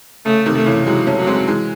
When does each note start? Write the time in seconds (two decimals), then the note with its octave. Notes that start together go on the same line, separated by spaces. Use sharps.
0.25 C#3 A3
0.46 C3 D#3
0.55 A3
0.66 C#3 E3
0.86 E3 F#3 G#3
1.07 A3 C#4
1.17 F#3
1.27 G#3 C4
1.47 E3 G#3